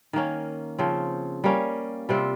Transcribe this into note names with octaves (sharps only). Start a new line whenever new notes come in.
D#3 A#3 C#4
C#3 F3 C4
G3 A#3 C#4
C3 G3 C4 F4